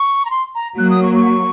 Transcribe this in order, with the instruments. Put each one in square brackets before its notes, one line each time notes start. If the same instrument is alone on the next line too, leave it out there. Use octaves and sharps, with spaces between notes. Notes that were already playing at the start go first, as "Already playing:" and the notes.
Already playing: [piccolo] C#6
A#5
C6
A#5
[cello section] F#3 A#3 [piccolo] F#6
[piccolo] D#6
C#6
C#6